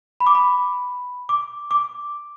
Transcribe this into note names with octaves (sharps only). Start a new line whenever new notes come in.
B5
D6
B5
D6
D6